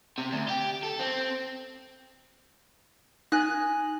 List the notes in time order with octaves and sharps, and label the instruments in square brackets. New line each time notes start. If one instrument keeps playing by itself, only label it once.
[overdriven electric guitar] C3
D2
G4
A4
C4
[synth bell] D#4 [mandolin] G#5 F#6